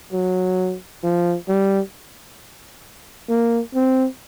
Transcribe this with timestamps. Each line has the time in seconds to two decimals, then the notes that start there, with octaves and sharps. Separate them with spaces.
0.13 F#3
1.04 F3
1.48 G3
3.29 A#3
3.75 C4